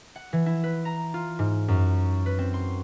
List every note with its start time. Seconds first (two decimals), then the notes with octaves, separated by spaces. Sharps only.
0.16 F#5
0.33 E3
0.46 E4
0.64 B4
0.85 A#5
1.14 F4
1.39 G#2
1.68 F#2
2.26 B4
2.39 C4
2.54 C6